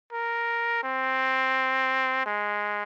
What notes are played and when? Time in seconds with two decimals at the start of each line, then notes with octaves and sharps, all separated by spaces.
0.13 A#4
0.83 C4
2.26 G#3